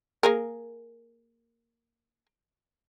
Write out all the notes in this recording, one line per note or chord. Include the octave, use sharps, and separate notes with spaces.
A#3 G#4 A#4